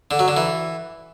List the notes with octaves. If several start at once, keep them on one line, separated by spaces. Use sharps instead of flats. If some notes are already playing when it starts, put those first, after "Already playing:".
D3
F#3
D3
E3